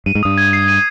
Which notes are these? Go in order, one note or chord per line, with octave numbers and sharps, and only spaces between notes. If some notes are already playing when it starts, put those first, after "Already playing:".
G2 D#7
G#2
G2 D#6
G#6
C7
D#7